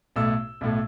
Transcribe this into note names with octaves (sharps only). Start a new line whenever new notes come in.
B1 A2 A3 E6
B1 A2 A3